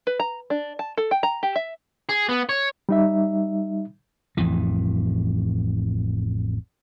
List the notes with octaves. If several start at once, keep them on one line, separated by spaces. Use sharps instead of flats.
B4
A#5
D4
A5
A4
G5
A#5
G4
E5
G#4
B3
C#5
G3 D#4 E5
A1 F2 E3